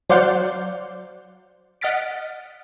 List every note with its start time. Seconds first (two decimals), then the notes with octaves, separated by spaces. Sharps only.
0.09 F#3 C5 D5 F5 F#5 G6
1.81 D#5 F#5 F6 A6 B6 D7